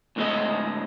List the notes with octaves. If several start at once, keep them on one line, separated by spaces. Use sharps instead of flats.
D2 A2 D3 G#3 C4 D#5